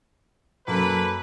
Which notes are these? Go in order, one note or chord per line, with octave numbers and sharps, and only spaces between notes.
F#2 A#3 A4 B4